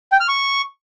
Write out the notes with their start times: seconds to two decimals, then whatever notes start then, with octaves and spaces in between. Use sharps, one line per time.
0.12 G5
0.20 F6
0.28 C#6